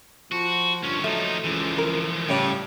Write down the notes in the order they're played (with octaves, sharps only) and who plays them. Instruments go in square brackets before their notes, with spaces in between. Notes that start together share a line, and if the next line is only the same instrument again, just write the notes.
[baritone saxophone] F3 [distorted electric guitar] F#4
[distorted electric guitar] D2 C#4 [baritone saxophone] G2
[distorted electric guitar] F3 D#4 [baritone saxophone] F#3 [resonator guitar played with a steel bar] A3
[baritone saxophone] C#2 [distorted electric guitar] E3 F3
[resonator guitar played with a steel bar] A#4
[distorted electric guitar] A2 [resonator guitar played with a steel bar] C#3 C#5 A5 [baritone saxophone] G3